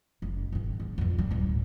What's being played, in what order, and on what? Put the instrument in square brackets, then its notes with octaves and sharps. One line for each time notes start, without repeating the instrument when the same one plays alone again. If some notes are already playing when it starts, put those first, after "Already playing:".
[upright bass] F#1
G#1 D#3
G#2
F2 G#2
G3
D2 A2